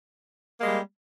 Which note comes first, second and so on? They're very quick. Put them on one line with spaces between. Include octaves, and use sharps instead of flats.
A#3 G#3 G3